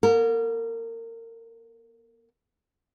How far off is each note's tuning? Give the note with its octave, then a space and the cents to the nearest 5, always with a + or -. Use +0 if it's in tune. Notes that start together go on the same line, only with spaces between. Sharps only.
A#3 +45 A#4 -30